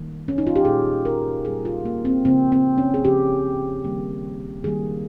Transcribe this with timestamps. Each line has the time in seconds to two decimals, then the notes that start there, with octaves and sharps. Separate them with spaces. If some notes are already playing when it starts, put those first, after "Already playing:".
Already playing: D#3 G3 A#3
0.28 C#4
0.38 D#4
0.47 F4
0.56 G4
0.65 A#2 G3 A#3 G#4
1.05 A#4
1.45 A#2 G3 A#3 G#4
1.65 F4
1.85 A#3
2.05 C4
2.25 C#3 F3 A#3 C4
2.52 C4
2.78 C#4
2.94 G#4
3.05 C#3 F3 A#3 G4
3.84 D#3 G3 A#3
4.64 D#3 G3 A#3 G#4